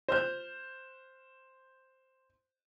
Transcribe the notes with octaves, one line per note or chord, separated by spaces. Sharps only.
C5 F6 G6